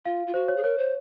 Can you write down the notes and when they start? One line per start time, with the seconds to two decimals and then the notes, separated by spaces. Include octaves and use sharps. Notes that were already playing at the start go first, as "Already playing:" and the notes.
0.05 F4 F5
0.27 F4
0.34 F#4 C5
0.48 C#5
0.56 G#4
0.64 A#4 C#5
0.78 C5